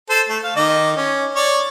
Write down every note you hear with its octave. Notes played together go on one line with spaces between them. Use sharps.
A4 C5
A3
F5
D#3 D#5 D6
C#4
C#5 D5